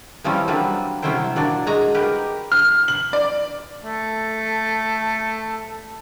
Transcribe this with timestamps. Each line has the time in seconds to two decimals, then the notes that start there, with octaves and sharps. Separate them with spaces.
0.24 E3 F3 G3 C4 C#4
0.48 F#3 G3 A#3 C4 D4 B4
1.02 C3 F#3 C#4 E4 C5 G5
1.36 A#2 F#3 D4 D5
1.67 G#3 F#4 G#5 A#5
1.94 G4 A#4 B4
2.52 F6
2.88 F#7
3.13 D5
3.82 A3 A4